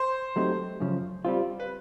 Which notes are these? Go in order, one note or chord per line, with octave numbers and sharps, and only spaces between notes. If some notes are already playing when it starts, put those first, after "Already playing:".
Already playing: C5
F#3 A3 C4 D#4 G4
F#2 C#3 F3
G3 C4 F4
B4